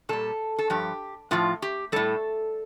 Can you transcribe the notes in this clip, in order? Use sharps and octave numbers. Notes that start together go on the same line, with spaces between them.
A#2 G3 A4
A4
G2 F3 G4
A2 F3 F4
G4
A2 G3 A4